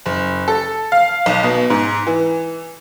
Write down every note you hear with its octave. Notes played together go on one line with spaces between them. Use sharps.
F#1
A4
F5
B1
B2
G#2
E3